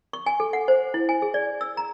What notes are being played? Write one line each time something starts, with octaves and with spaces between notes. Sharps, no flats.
C#6
G#5
A4
F#5
C5
E4
G#5
G#4
D5
E6
A#5